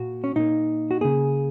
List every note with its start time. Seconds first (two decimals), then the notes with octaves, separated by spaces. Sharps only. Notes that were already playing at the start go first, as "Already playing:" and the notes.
Already playing: A#2 A#3 F#4
0.24 C#4
0.35 A#2 A#3 D#4
0.91 F#4
1.01 C#3 A#3 G#4